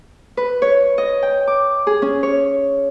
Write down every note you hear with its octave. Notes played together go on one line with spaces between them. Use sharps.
B4
C#5
D#5
G5
D6
G#4
C#4
C#5